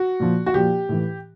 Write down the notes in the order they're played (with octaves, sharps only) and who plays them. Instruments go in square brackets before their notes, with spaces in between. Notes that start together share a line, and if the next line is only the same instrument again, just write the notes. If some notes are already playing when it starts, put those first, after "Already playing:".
Already playing: [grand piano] F#4
A#2 F3
F#4
A#2 F3 G4
A2 E3